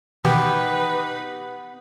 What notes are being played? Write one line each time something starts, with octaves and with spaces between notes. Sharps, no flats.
B2 D#3 E3 B3 D#4 G4 B4